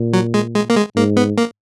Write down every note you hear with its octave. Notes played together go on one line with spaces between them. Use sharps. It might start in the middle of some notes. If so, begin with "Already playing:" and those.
Already playing: A#2
F#3
G#3
G#3
A#3
G#3
G#2 A#3
B3
A#3